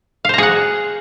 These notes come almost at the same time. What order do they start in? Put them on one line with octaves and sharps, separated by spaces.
F5 C5 A#5 G#4 F#5